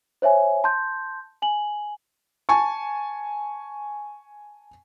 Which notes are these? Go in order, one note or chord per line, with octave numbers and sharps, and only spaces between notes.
C5 C#5 E5 G#5
A5 C6 G6
G#5 F#7
G#5 A5 C#6